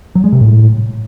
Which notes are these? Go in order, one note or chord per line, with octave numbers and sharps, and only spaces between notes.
F#3
G#3
C3
A2